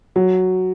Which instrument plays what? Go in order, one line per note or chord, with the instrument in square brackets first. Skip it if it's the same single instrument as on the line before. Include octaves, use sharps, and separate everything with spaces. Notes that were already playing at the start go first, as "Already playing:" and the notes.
[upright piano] F#3